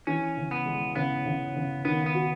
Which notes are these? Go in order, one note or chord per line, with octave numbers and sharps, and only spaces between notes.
E3 C#4
C#3
B3
G#3
C#3 B3
C#3
C#3
D#3 B3
B3
F#4